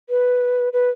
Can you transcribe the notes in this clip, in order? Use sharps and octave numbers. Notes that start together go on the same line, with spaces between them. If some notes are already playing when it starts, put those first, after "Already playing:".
B4
B4